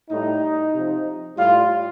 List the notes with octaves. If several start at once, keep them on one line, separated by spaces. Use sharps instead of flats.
A2 G3 D#4
C3 F3
A2 G3 F4